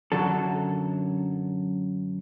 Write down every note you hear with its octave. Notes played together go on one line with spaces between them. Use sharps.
F#2 D3 F#3 A4